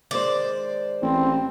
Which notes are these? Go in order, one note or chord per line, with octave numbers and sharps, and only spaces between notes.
D#3 G#3 C5 D5
A1 C4